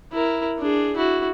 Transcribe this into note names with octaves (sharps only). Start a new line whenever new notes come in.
E4 A#4
D4 G#4
E4 F#4